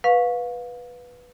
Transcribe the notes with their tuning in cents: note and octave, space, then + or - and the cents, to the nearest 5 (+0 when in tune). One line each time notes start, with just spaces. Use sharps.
B4 -5 F5 +25 C#6 +0